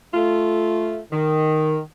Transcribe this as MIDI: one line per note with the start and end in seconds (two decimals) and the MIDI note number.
0.13 0.98 57
0.13 0.98 65
1.12 1.78 51